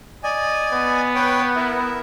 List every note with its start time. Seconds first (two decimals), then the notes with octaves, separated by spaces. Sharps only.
0.23 D5 D#5 G#5
0.73 B3
1.15 B4 C#5 G5
1.56 E4 A#4 E5